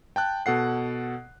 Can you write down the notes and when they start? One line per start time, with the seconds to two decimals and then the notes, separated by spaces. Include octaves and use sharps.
0.16 G5 A5 F#6
0.46 B2 A4 F#5 C7